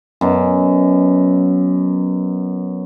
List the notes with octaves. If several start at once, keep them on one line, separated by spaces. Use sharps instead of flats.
F#2 B2